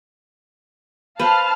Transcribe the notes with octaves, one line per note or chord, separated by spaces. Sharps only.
B4 C5 F5 A5 F6